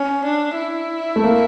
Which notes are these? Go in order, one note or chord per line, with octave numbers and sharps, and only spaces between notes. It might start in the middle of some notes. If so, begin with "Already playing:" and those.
Already playing: C#4
D4
E4
A3
A#3